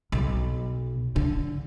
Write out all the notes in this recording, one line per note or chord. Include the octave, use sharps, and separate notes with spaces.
B1
D3